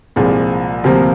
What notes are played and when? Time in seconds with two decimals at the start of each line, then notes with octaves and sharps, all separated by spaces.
0.16 C2 A#2 F3 G#3
0.84 D2 C3 F3 A#3